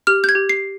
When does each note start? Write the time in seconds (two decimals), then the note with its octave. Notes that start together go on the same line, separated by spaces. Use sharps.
0.07 G4 F6
0.24 G6
0.29 G#6
0.35 G4
0.49 C7